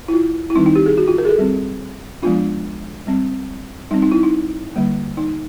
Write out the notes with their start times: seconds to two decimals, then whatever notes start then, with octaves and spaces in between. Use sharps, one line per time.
0.08 E4
0.13 F4
0.50 E4
0.55 D#3 G3 C4 D#4
0.66 D#4
0.75 G4
0.86 G#4
0.98 F#4
1.08 F4
1.18 A#4
1.25 G#4
1.29 A4
1.38 G3 C4
2.23 F3 G#3 B3 D4 F4
3.07 G3 C4
3.91 G3 C4 D#4
4.02 D#4
4.12 E4
4.23 D#4
4.76 D3 G3 A#3
5.17 D#4